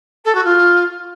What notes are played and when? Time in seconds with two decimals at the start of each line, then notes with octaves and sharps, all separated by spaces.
0.25 A4
0.34 F#4
0.44 F4